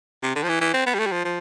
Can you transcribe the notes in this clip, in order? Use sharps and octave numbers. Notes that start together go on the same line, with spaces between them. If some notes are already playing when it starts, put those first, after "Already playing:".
C3
D3
F3
E3
E3
C4
B3
G3
A3
G3
F3
F3